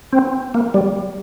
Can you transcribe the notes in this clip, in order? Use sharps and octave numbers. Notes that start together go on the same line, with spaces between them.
C4
A#3
G3